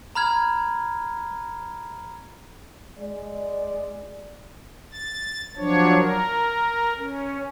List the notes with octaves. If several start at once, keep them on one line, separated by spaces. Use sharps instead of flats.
A#5 B5 F6 G#6
G#3 D5
A6
F3 F#3 D4 C#5
A#4
C#4